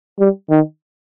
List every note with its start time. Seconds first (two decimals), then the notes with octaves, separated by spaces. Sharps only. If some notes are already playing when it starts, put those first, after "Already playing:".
0.19 G3
0.50 D#3